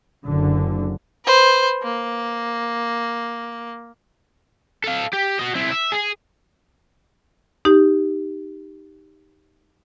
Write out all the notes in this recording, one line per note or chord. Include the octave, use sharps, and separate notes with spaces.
F#1 D3
B4 C5
A#3
A4 F5
G4
F#4 D#5
C4 E4
E5
G#4
D#4 G4